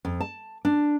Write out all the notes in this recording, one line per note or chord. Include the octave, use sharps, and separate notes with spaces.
F2
A5
D4